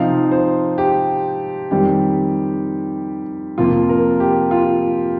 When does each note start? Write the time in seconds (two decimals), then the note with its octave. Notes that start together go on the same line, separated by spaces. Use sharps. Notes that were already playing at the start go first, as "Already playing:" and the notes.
Already playing: C3 F3 C4 D#4 F5
0.32 C5
0.78 G4
1.71 F2 D#3 G3 C4 G4
3.58 F2 C3 F3 A#3 F4
3.89 A#4
4.20 G4
4.51 F4